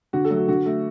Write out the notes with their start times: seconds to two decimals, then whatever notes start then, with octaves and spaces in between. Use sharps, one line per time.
0.13 D3 F#4
0.24 A4
0.30 F#3 A3
0.37 F#4
0.48 D3 F#4
0.66 A3